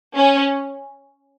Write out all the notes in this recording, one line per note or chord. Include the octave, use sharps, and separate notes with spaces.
C#4